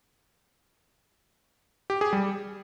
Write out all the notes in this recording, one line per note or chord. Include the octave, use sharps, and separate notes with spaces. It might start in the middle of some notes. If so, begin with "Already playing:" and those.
G4
G#4
G3